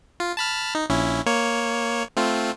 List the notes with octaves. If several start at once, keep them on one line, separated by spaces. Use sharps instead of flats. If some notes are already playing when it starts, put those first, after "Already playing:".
F4
A5 B5 F6
D#4
A#1 C#4 E4
A#3 C#5
A3 C4 F4